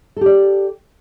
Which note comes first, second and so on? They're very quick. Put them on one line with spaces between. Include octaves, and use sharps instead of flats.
A4 G4 D5